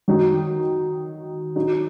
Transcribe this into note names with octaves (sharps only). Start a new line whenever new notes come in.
D#3 F#3 D#4
F#3 D#4